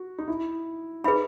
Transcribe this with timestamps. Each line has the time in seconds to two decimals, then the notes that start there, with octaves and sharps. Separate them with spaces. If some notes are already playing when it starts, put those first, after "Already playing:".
Already playing: F#4
0.18 D#4
0.28 E4
1.04 D#4 G#4 B4 E5 B5